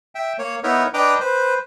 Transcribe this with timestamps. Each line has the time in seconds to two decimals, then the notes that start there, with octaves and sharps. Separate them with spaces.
0.15 E5 G5
0.39 A#3 C#5
0.63 B3 D#4 E4 A#4 C#5
0.94 D4 B4 D#5 G5 A#5 D6
1.20 B4 C5